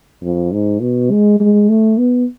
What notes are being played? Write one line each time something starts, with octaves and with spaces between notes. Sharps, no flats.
F2
G#2
B2
G#3
G#3
A3
B3